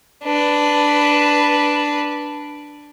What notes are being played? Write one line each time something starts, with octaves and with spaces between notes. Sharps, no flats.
D4 B4